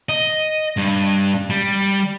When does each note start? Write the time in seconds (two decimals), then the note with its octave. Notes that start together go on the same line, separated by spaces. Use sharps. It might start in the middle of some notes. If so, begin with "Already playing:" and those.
0.09 D#5
0.77 G2
1.50 G3